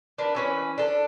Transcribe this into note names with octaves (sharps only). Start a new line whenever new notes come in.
D4 A#4 B4
E3 C#4 B4
D4 A4